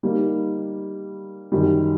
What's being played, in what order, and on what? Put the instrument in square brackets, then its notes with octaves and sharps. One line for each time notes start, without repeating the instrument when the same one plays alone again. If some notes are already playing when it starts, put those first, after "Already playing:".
[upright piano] G3 A#3 D#4
F#2 D#3 G3